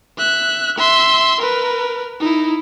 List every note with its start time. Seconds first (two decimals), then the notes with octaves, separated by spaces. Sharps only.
0.18 E5 F#6
0.78 E5 C6
1.41 A#4 B4
2.20 D#4 E4